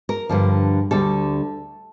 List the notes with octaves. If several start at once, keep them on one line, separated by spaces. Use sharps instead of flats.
A#4
G2 D3 F3
D2 D3 G3 A4